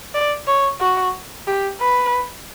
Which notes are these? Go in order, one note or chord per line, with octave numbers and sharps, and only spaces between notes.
D5
C#5
F#4
G4
B4